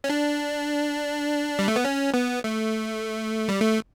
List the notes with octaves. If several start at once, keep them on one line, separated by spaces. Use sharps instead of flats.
C#4
D4
G3
A3
B3
C#4
B3
A3
G3
A3